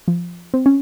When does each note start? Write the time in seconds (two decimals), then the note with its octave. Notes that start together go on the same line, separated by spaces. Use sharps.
0.08 F3
0.54 C4
0.66 C#4